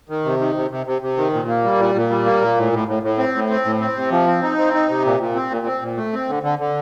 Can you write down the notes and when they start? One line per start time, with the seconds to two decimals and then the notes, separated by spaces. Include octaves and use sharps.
0.09 D#3
0.25 C3
0.40 D#3
0.56 C3
0.71 C3
0.87 C3
1.02 C3
1.17 D#3
1.33 A#2
1.48 A#3
1.64 G3
1.79 A#2
1.95 A#2
2.10 G3
2.26 A#3
2.42 A#2
2.57 A2
2.73 A2
2.88 A2
3.03 A2
3.18 C4
3.35 A2
3.49 C4
3.65 A2
3.80 C4
3.96 C3
4.11 F3
4.27 C4
4.43 D#4
4.58 C4
4.74 D#4
4.89 C3
5.05 A#2
5.20 A#2
5.35 C4
5.50 A#2
5.66 C4
5.81 A#2
5.97 A3
6.13 C4
6.29 D3
6.43 D3
6.59 D3